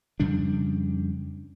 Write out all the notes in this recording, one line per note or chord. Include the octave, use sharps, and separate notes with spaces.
F2 C#3 G3 D4